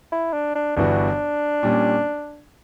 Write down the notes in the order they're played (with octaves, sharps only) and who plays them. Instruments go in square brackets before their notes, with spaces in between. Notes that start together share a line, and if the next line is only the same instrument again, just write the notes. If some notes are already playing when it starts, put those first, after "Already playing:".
[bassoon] E4
D4
D4
[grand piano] G1 G2 E3 B3 F#4 [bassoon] D4
[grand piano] A#2 G3 C#4